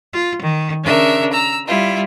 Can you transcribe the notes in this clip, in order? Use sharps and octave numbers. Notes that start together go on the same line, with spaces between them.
F4
D#3
C#3 D4 A#4 E5
A#5 E6
G3 E4 F4